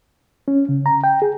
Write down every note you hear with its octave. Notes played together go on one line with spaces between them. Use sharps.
C#4
C#3
A#5
G5
G#4